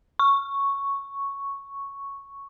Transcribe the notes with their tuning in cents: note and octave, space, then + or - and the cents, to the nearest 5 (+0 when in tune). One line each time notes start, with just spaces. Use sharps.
C#6 +0